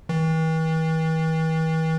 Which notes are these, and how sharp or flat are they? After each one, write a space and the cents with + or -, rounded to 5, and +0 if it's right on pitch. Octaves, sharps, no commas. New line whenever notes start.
E3 -45